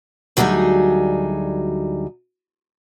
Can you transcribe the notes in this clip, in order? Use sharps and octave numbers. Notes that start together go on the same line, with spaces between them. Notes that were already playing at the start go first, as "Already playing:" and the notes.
D2 F#3 G3 D#4 G#4